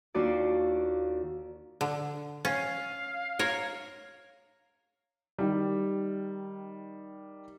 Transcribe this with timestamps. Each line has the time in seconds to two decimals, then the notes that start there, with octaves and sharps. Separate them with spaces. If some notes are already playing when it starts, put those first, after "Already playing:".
0.14 D#2 D4 F4 F#4 D5
1.81 D3
2.45 C#4 F5
3.39 A#4 C#5
5.39 D#3 G3